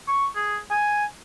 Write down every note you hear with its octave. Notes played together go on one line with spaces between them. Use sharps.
C#6
G#4
G#5